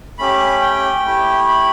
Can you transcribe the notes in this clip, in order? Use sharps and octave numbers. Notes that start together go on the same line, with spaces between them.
A3 C#4 G4 B5
G5
A3 E4 G4
B5